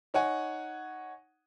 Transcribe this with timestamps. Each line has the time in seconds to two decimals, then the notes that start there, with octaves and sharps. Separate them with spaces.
0.14 D#4 C#5 F#5 G#5